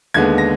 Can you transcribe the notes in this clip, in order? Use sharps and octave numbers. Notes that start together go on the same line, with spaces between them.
D#2 D3 G#3 B3 G#6
A#6